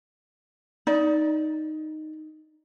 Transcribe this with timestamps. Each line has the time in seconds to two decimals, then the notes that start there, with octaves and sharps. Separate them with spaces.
0.87 D#4 D5